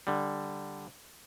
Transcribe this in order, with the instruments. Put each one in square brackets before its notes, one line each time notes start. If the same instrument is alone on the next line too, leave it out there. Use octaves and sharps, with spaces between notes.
[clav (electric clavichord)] D3 G3